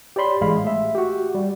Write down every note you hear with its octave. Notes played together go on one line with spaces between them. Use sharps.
G4 C#5 D5 B5 C6
A1 G#3 F5 B5
A3 E5
F#4 G4
G3